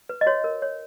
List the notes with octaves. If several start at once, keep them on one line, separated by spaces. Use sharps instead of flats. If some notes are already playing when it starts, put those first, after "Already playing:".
B4
D#5
F#4 C#5
A#4
C#5